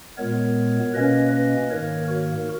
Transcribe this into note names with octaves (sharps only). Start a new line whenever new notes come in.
A#2 G#3 B3 A#4 C#5
B2 A#3 C#4 B4 D#5
B4 D#5
G#2 D#3 A#3 A#4 C#5
F#4 A#4